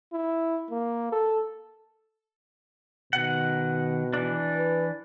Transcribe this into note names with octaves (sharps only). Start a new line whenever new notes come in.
E4
A#3
A4
B2 D#3 F#5
E3 D4
B4